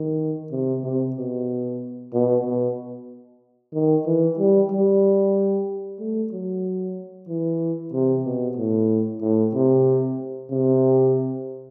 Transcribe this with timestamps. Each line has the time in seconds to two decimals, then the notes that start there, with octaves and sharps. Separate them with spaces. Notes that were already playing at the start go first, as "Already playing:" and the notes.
Already playing: D#3
0.52 C3
0.84 C3
1.16 B2
2.13 B2
2.45 B2
3.74 D#3
4.06 E3
4.39 G3
4.71 G3
6.00 A3
6.32 F#3
7.28 E3
7.93 C3
8.25 B2
8.57 A2
9.22 A2
9.54 C3
10.51 C3